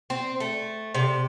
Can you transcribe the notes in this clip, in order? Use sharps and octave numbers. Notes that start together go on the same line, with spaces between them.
C4
A3
C3